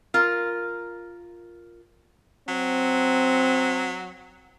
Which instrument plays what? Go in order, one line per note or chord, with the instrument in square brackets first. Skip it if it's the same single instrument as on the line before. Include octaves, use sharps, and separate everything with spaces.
[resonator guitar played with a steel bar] F4 A#4
[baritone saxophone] F#3 [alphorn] C4